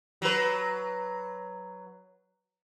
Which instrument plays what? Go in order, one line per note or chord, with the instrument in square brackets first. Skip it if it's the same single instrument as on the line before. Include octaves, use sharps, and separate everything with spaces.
[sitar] F#3 B4